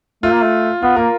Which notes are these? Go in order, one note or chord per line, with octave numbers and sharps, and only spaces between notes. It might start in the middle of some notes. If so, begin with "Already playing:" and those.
A3 F4
A#3
A3
B3 F4
A#3 A#4